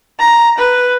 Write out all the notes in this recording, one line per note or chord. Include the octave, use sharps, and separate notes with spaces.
A#5
B4